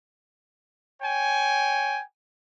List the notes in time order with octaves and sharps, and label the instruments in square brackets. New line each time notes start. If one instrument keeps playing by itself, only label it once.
[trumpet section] C#5 G5 G#5